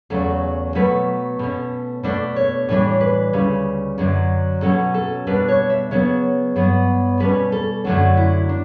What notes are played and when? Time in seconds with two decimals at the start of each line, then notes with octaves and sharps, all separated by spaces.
0.10 E2 C#3 F#3 A3 A4
0.75 B2 F#3 A3 B4
1.39 B2 A3 C#4
2.03 B2 A3 D4 D5
2.36 C#5
2.68 A2 E3 G3 D4 C#5
3.01 B4
3.33 D2 C#3 G3
3.98 F#2 D3 F#3
4.62 B2 F#3 C#4 A4
4.94 A4
5.27 B2 G3 D4 B4
5.48 C#5
5.70 E5
5.91 C#3 F#3 B3 C#5
6.56 G2 F#3 B3
7.20 B2 G3 C#4 B4
7.52 A4
7.85 F#2 D3 F#3 A3 D4 F#4
8.17 E4
8.49 D4